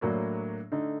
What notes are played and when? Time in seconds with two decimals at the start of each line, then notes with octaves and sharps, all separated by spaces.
0.01 A2 F#3 A#3 D4
0.72 D3 A3 D#4